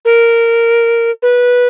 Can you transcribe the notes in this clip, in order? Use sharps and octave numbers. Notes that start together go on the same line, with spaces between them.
A#4
B4